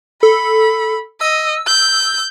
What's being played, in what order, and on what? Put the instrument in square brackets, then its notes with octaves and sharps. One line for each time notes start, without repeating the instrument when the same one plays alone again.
[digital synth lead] A4 [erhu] B5
[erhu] D#5 [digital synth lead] E6
[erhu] G6